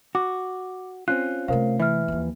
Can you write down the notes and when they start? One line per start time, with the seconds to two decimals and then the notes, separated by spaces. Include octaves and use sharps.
0.15 F#4 D6
1.08 C4 C#4 F4 F#6
1.48 C3 A3 A#4 C5 F5
1.80 E3 E5 F6
2.08 D#2 F3